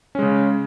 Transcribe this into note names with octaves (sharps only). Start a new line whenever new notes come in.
C#3 G#3 C#4